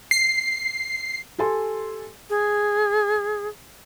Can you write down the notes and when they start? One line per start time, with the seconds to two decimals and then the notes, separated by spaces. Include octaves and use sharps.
0.11 C7
1.39 G4 A4 G#5 C6
2.29 G#4